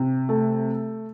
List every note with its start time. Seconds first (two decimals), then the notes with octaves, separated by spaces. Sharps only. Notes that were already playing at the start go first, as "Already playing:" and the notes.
Already playing: C3
0.29 A3